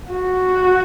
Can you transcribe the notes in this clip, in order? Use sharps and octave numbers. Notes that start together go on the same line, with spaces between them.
F#4